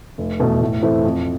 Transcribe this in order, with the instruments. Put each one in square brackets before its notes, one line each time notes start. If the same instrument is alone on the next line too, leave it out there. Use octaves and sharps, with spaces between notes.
[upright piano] F1
E2 B2 A3
A2
E3 A3 C4 E4
F2